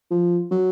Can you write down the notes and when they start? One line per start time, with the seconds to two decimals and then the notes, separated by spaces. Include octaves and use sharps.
0.10 F3
0.51 F#3